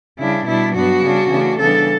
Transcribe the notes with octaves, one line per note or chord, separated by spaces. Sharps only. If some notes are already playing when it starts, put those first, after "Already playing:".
C#3 G3 D4 E4
B2 G3 D4 E4
G2 F#3 B3 D4 F#4
C#3 G3 D4
C#3 E3 A3 D4
C#3 E3 G3 B3 D4 A4